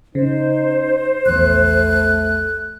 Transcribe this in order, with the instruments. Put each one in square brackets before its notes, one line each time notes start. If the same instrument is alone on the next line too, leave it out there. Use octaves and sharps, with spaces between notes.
[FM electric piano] C#3 [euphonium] D#4 [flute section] C5
[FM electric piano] A#1 E2 [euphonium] A3 [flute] F#6